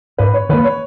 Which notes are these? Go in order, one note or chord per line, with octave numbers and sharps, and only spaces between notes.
G#2 B4
C#5
D#3 A#3 B4
C#5